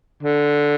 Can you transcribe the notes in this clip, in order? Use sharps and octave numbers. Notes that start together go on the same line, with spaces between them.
D3